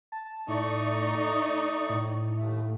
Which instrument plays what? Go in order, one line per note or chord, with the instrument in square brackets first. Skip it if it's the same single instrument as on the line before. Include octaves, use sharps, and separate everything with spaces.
[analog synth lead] A5
[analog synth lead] A2 [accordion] A3 D5 C#6 [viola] D#4
[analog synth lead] D#6
A2
[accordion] D#2 A3